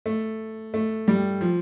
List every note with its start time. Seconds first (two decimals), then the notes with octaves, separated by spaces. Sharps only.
0.06 A3
0.74 A3
1.08 G3
1.41 F3